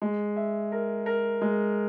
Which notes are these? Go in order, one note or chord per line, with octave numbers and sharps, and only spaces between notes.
G#3
E5
A#4
A#4
G#3